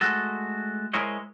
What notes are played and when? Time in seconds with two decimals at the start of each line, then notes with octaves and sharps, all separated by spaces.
0.01 G#3 A3 F#4 A4
0.93 G#3 E4 A#4 C5 C#5 D#5